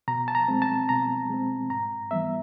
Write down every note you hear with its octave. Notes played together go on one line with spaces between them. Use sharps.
B2 A#5
A5
A#5
G#3 C4
A5
B2 A#5
G#3 C4
G#2 A#5
E3 G3 B3 E5